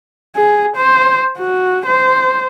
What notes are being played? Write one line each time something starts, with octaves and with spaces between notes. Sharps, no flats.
G#4
C5
F#4
C5